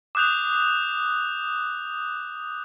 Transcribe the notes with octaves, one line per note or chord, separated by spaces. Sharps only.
D6 D#6 F#6 G6 F7